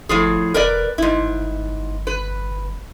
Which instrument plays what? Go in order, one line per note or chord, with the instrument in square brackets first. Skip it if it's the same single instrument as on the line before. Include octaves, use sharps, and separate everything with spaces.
[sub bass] G1 [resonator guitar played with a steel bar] A2 F3 G#4
[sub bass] E1 [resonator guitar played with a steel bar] A#4 B4 D5
[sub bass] G1 [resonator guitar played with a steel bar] G#2 E4
[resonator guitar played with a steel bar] B4